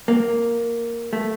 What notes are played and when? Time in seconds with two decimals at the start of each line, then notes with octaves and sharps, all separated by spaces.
0.08 A#3
1.13 A3